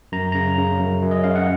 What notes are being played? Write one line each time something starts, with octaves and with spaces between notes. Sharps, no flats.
F#2 A#5
C#3 A#5
C#3
F#2
F#2
D#5
C#3 F5
F#5